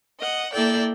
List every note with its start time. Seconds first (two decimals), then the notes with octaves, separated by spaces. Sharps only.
0.20 D#5 F#5 D#6
0.52 A#3 E4 A4 D5 G5